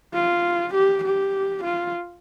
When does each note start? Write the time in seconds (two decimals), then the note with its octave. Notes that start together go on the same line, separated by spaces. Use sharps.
0.14 F4
0.74 G4
1.04 G4
1.64 F4